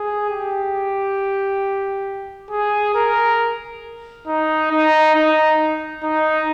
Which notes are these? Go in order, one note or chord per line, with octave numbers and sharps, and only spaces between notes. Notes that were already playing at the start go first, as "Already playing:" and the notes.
Already playing: G#4
G4
G#4
A#4
D#4
D#4
D#4
D#4